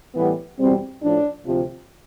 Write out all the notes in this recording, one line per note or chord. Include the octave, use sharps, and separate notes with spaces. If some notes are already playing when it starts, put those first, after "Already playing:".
A2 E3 G3 B3
E2 B2 G3 C4
A2 F3 D4
D2 C3 F3